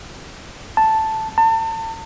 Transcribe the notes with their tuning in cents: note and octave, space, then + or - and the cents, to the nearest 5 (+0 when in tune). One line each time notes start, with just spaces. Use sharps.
A5 +0
A5 +35